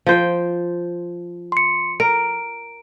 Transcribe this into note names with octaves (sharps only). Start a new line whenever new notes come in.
F3 C5 G5
C6 C#7
A#4 D7